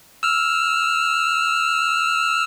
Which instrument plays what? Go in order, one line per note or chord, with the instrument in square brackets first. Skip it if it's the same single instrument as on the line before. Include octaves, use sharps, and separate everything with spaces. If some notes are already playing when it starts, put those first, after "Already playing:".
[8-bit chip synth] E6 F6